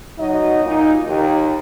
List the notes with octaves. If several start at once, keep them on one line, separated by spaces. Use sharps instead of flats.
F#3 D#4 F#4 D#5
A#2 D#4
D#2 D#3